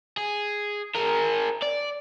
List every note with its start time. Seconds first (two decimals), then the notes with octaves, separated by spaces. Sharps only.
0.17 G#4
0.96 G#4 A#4
1.62 D5